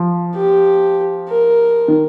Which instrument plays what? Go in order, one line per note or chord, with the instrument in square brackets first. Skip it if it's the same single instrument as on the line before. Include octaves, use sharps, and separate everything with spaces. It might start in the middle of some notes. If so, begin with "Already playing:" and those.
Already playing: [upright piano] F3
[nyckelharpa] G4
A#4
[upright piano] D#3